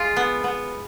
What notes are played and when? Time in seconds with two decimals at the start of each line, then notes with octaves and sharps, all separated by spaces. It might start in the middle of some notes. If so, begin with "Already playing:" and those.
Already playing: G#3 F4
0.16 B3
0.44 B3